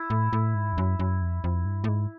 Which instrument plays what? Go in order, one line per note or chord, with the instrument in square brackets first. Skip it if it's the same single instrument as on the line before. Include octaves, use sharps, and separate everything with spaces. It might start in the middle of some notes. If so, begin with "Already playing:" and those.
Already playing: [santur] E4
[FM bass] A2
A2
G#2
F2
F#2
F#2
F2
F2
G2
A2
G#2